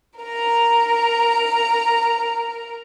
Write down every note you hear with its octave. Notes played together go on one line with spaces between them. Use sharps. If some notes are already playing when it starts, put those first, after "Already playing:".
A#4 A#5